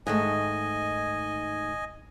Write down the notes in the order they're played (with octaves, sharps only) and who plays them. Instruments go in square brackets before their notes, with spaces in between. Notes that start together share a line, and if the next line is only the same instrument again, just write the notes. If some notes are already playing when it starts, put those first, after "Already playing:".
[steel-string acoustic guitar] G#2 D#3 A3 [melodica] D#5 G#5